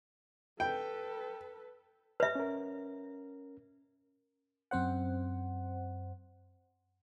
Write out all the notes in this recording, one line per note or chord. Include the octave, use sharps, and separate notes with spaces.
A4 B4 G5
B4 E5
C#4 A#4
F#2 C4 C5 F#5